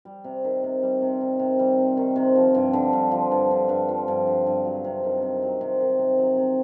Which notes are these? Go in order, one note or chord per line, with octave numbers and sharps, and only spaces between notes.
G3
C3
D#3
C3
G3
C3
D#3
C3
G3
C3
D#3
C3
F3
G2
D3
G2
F3
G2
D3
G2
F3
G2
D3
G2
F#3
C3
D#3
C3
F#3
C3
D#3
C3
F#3
C3